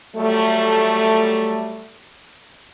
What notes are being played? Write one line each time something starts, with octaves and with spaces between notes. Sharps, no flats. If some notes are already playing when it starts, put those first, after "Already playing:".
F#3 G3 A3